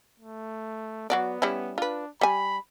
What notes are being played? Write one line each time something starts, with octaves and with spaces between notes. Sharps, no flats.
A3
F#3 B3 F#4 D5
G3 C#4 E4
D4 F4 B4
G3 G#5 B5